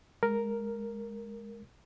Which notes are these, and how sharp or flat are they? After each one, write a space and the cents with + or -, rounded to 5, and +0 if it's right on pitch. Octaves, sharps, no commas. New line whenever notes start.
G#3 +0 A#4 +0